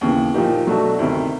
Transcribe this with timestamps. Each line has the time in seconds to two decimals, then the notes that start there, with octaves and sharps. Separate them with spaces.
0.01 D#2 C#3 E3
0.34 A#2 F3 A#3 D#4 G4
0.67 B2 F#3 A3 D4 F#4
0.99 D2 C3 D#3